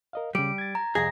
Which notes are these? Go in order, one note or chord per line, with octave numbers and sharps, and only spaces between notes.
A#4 D#5 F5
C#3 G3 D6 D7
G#6 A6
A#5
C2 F2 G#4 D#5 A#6